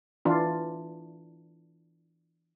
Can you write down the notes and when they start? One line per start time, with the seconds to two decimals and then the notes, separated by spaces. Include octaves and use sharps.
0.25 E3 D4 F4